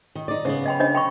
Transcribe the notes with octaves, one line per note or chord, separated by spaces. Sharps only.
D#3
D#4 D5
C#3 B3 C5
D#5 G5 B5
D4 C5 D#5
G5 B5 C#6